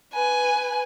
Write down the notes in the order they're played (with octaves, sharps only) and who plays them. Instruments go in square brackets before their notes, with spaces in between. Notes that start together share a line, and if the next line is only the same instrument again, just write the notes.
[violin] B4 G#5